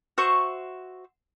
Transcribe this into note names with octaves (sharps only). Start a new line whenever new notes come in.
F#4 C5 E5 C#6